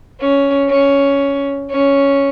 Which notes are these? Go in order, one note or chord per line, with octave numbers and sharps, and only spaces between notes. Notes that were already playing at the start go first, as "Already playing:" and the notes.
C#4
C#4
C#4